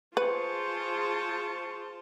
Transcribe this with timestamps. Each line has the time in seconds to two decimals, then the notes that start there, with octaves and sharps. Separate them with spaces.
0.17 F4 G#4 B4 C5 A5 C#6